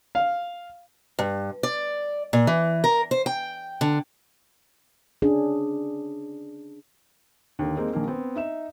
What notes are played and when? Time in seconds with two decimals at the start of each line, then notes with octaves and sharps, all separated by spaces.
0.15 F5
1.19 G2
1.63 D5
2.33 A#2
2.47 E3
2.84 A#4
3.11 C5
3.26 G5
3.81 D3
5.22 C#4 D4 G#4
7.59 D#2 D3
7.77 G#3 A#3 C4 D#4
7.93 A#1 D#3 A#3
8.08 B3 C4
8.36 D#4 E5 E7